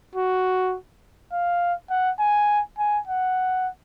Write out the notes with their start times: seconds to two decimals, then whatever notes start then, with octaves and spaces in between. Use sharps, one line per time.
0.15 F#4
1.33 F5
1.90 F#5
2.20 G#5
2.79 G#5
3.07 F#5